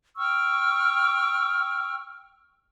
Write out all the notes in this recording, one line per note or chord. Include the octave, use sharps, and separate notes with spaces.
G5 C#6 E6 F6